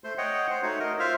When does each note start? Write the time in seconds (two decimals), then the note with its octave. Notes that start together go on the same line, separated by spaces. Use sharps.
0.04 A3 C5 C6
0.18 C#5 D#5 F#5 G5
0.50 C5
0.62 A3 D#4 F#4 C#5 F#5
0.80 A#4 D#5
0.99 F4 C5 E5 F5 F6